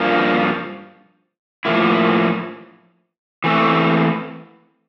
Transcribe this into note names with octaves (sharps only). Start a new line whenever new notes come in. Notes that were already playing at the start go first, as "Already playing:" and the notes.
Already playing: G2 F3 A#3
A2 F3 A#3 E4
E3 A3 C4